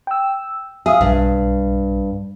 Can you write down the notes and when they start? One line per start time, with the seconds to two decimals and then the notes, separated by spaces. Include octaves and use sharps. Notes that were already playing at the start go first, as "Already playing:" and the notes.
0.07 G5 E6
0.86 G#4 E5 F5 D#6
1.01 B1 G2